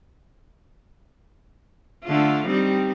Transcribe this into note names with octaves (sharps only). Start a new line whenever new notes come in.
D3 A3 F4
G3 C4 D#4